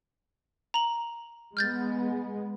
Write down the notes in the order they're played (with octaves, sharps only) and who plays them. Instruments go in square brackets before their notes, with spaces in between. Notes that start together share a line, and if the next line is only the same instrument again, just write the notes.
[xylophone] A#5 F#7
[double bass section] G#3 B3 [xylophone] F6 G6 A6